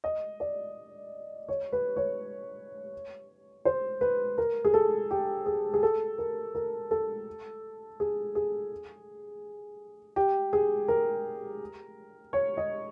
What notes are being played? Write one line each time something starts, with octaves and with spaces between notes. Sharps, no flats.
D#5
D5
C#5
B4
C#5
C5
B4
A#4
G#4
A4
G4
G#4
G#4
A4
A#4
A#4
A4
G#4
G#4
G4
G#4
A#4
C#5
D#5